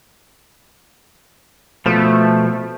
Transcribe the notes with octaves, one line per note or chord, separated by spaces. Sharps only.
B2 F3 A3